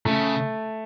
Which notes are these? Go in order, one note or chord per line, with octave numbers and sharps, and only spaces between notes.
C#3 A3